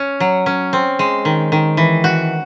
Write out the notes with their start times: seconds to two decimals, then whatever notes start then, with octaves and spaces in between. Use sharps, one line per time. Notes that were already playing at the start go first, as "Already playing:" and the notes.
Already playing: C#4
0.20 F#3
0.46 C#4
0.73 C4
0.99 G#3
1.25 D#3
1.52 D#3
1.77 E3
2.04 F#4